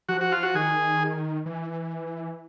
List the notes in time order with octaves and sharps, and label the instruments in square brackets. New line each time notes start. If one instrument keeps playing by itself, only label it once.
[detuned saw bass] F3 [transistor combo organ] F#4
[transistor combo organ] F#4
F4
F#4
[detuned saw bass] D#3 [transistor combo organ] G#4
[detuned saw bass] E3